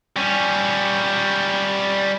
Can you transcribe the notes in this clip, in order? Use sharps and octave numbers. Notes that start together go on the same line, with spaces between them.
G3 C#4